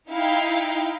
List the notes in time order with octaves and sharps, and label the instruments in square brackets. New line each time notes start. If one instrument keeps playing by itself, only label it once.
[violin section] D#4 E4 F5 G5